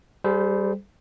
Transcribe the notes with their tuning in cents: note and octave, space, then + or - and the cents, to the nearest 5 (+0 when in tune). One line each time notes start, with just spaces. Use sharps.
G3 +0 G#4 +45 C5 -20